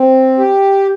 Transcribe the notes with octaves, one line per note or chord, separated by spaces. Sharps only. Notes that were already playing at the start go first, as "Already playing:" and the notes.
Already playing: C4
G4